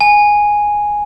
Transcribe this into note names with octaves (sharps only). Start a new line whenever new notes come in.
G#5